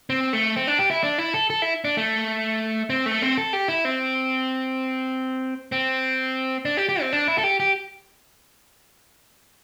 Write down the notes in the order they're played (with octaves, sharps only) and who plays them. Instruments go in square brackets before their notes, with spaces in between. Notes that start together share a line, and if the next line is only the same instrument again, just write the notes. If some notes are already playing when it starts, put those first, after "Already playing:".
[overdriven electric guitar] C4
A3
C4
D4
G4
E4
D4
E4
A4
A4
E4
D4
A3
C4
A3
C4
A4
G4
E4
C4
C4
D4
G4
G4
C4
D4
E4
A4
G4
G4